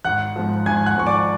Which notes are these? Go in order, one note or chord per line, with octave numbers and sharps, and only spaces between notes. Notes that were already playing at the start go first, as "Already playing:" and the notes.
G#1 F#5 F#6
G#2 F3
G#1 G#5 G#6
F#5 F#6
G#2 F3 C#6
D5 D6